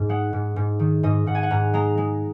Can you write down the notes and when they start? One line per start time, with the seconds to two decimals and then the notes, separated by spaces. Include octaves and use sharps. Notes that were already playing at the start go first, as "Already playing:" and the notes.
Already playing: G#2
0.09 G#3 F#5
0.33 G#2
0.56 G#2
0.79 D#3
1.03 G#2 D#5
1.26 G#2 F#5
1.35 G#5
1.43 F#5
1.51 G#2 A#5
1.74 G#3 A#5
1.98 G#3